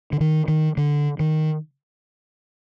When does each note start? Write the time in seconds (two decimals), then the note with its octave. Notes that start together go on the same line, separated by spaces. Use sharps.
0.13 D3
0.20 D#3
0.48 D#3
0.77 D3
1.19 D#3